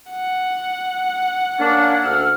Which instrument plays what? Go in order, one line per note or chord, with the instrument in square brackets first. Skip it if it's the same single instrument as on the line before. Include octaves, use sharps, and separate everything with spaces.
[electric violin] F#5
[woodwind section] A#3 C#4 D4
D2 E6 F6